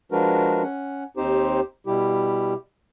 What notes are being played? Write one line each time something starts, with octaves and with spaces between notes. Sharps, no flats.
F3 G#3 D4 F#4 A#4 B4
C#4 F#5
D#2 C4 D#4 G4 C5
B2 G3 E4 G4